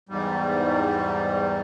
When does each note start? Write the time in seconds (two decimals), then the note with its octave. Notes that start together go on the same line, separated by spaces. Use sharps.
0.09 E2 G#2 G3